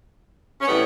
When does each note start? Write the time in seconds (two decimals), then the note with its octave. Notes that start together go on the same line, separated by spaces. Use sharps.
0.61 C#4
0.68 A2 E3 G3 B3